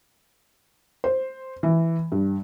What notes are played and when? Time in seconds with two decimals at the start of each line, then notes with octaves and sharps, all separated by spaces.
1.04 C5
1.63 E3
2.12 G2